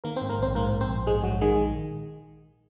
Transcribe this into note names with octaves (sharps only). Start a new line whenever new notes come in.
D#3 A#3 A#4
C4 C5
G#2
A#3 A#4
A#1 C4 C5
G#2 A#3 A#4
A#1
C4 C5
A#1
G#2 G#3 G#4
A#1 F#3 F#4
D#3 G#3 G#4
A#1